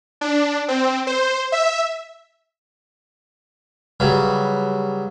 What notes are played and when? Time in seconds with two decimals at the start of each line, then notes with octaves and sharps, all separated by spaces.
0.21 D4
0.68 C4
1.07 C5
1.52 E5
4.00 C#3 F#3 G3 B4